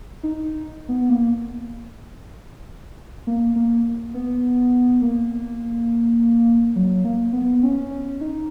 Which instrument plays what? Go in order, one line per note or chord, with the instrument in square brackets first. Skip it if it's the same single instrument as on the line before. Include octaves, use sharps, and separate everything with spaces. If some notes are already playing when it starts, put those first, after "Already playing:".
[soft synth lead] D#4
B3
A#3
A#3
A#3
B3
A#3
F#3
A#3
B3
C#4
C#4
D#4